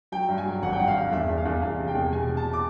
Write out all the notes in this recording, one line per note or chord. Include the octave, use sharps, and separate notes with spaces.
F#3 G5
G2
G#5
F#3
G#1 F#5
G5
G2 F#5
F5
G2
E2 E5
E2
F5
E2
E2 F5
C3
G5
E2
B2 G#5
B2
A5
D6